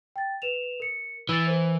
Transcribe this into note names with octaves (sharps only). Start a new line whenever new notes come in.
G5 A6
B4 E7 F7
A#4 C#7
E3 E6 A6
A#4 C5